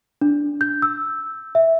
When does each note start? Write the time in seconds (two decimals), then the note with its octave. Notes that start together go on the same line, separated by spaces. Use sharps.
0.21 D4
0.61 G6
0.82 E6
1.55 E5